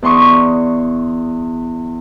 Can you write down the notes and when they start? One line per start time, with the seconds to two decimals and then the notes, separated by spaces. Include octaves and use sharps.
0.02 E2 D5 C6 C#6 D#6